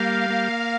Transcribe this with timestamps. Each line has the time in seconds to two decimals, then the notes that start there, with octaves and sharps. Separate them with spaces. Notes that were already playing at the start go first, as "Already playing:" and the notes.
Already playing: G3 A#3 F5
0.30 A#3